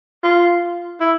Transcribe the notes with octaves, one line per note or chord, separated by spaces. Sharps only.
F4
E4